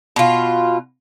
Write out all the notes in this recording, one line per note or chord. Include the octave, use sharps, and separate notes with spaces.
B2 F4